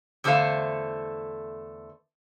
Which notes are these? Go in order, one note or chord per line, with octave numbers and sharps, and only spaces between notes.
E2 D3 A3 C4 C5 F5